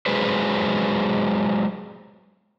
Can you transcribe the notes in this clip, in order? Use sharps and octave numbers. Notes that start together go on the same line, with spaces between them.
F#3 G#3 G#4 B4 C5